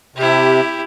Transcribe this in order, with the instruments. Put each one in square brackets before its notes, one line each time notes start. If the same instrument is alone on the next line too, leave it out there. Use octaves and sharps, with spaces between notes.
[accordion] C3 [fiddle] E4 G4